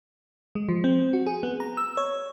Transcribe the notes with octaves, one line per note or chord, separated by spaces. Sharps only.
G#3
F3
C4
F#4
G#4
B3
A#5
E6
C#5